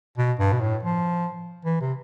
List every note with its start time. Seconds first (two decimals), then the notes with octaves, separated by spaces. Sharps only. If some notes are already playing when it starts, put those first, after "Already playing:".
0.18 B2
0.39 G2
0.53 B2
0.61 A2
0.83 F3
1.65 E3
1.81 C3